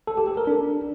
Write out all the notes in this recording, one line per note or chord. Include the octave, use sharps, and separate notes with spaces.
A4
G4
A4
A#4
D4